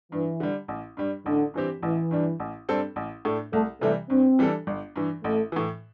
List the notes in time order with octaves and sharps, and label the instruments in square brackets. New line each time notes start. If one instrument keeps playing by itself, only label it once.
[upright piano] G2 [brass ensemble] E3
[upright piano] D3 G3
A1
G2 G3
[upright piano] A1 [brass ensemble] D3
[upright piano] G2 E3 C4 G4
[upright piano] A1 [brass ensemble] E3
[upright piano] G2 G3 D4
A1
G2 G3 C4 A4
A1
A2 A3 D4
[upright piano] C2 [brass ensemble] A3
[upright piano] C3 E3 G3 [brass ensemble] A3
[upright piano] G2 [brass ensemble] C4
[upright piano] E3 G3 D4 A4
G1
G2 E3
[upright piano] A1 [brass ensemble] A3
[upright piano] A2 E3